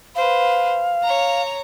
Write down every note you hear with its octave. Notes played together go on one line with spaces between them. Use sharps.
B4 C5 F5
C#5 A#5